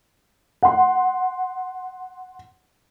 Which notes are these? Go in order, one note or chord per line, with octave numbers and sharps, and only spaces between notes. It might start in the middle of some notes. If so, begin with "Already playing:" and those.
F#5 C6